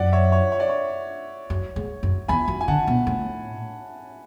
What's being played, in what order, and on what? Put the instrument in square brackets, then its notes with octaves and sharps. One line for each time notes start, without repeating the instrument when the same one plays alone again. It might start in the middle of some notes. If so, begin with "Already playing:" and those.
Already playing: [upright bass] F#2 [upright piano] D5 F#5
[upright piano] C#5 E5
C#5
C#5
D5
C#5
[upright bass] F#2
G#2
F#2
[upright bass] E2 [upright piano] G#5 B5
[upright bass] F#2
[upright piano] G#5
[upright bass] D3 [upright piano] F#5 A5
[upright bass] B2
A2